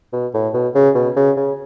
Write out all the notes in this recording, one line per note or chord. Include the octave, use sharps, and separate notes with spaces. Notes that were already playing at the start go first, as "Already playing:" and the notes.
B2
A2
B2
C#3
B2
C#3
C#3